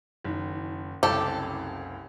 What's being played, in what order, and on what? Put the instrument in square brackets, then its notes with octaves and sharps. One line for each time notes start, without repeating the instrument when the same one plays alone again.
[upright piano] F#1 D#3
[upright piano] F#1 C2 C#3 [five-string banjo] G4 A4